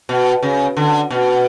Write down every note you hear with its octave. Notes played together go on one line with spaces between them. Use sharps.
B2
C#3
D3
B2